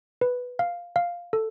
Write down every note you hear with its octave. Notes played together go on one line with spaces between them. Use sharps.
B4
F5
F5
A4